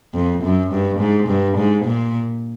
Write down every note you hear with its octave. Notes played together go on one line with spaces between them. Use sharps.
F2
F#2
G2
G#2
G2
G#2
A#2